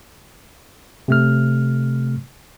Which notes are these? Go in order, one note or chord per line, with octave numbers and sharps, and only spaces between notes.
C3 A3 F6